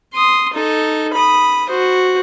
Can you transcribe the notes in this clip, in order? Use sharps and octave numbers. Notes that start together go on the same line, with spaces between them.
C6 D#6
D#4 A4
B5 D#6
F#4 C5